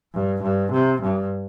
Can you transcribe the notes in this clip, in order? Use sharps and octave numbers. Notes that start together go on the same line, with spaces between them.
G2
G2
C3
G2